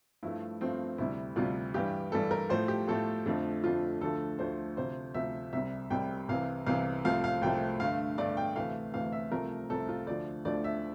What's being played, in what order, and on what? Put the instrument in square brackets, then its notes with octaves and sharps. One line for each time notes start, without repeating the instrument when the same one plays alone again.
[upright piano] G2 F3 A3 E4
G2 F3 A3 C4
D2 C3 G3 E4
D2 C3 G3 F4
G2 E3 G3 G4
G2 E3 G3 A4
A#4
A2 F3 A3 C5
G4
A2 F3 A3 A4
F2 D3 F3 A3
F2 D3 F3 A3 F4
D2 D3 F3 A3 A4
D2 D3 F3 A3 C5
D2 C3 F3 C5
D2 C3 F3 E5
C2 C3 G3 E5
C2 C3 G3 G5
C2 C3 E3 F5
C2 C3 E3 F5
C2 C3 F3 A3 F5
F5
C2 C3 F3 A3 G5
G2 D3 A3 F5
G2 D3 A3 D5
G5
D2 C3 E3 A3 F5
D2 C3 E3 A3 F5
E5
C2 C3 F3 A3 A#4
C2 C3 F3 A3 A4
F4
D2 D3 F3 A3 D5
D2 D3 F3 A3 D5
E5